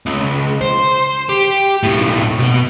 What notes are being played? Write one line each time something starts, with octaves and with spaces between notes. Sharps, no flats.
C#2
C5
G4
B1 A2
B2 F#5